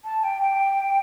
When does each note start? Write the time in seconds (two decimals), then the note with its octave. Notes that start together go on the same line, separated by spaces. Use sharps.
0.04 A5
0.24 G5
0.41 G5